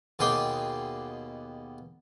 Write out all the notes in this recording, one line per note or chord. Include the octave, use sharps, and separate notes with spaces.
D#2 B2 G#4 G5 C6 D6